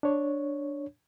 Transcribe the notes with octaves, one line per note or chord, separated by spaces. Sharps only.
D4 C#5